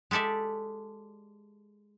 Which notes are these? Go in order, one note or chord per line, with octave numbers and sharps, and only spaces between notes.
G#3 G4 A4 D5 E5